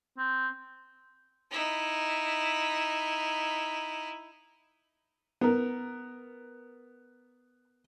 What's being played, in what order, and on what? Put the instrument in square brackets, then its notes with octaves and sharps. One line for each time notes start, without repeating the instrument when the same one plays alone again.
[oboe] C4
[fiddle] D#4 E4
[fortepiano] B3 A#4